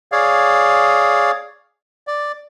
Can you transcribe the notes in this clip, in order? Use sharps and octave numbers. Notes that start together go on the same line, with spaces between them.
G#4 C#5 D5 F5
D5